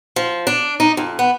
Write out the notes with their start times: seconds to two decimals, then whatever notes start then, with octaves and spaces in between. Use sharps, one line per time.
0.16 F3
0.47 D4
0.80 D#4
0.97 F2
1.19 B3